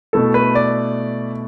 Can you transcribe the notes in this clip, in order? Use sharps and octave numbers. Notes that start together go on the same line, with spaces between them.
B2 A3 E4 A4
B4
D5